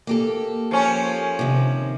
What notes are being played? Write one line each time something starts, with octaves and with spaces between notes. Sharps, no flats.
A#3 G4 A4
F3 C#4
C3 D#3